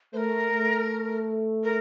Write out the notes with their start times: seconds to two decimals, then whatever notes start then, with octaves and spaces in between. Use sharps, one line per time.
0.13 A3 C5
0.17 A#4
0.51 A3
1.64 A#4